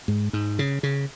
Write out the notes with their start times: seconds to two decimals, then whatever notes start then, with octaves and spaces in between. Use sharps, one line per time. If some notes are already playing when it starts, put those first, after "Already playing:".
0.08 G#2
0.33 G#2
0.59 C#3
0.83 C#3